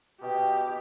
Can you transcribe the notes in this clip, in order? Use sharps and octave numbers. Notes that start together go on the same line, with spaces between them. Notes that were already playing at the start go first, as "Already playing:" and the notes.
B2 G4 D#5 G5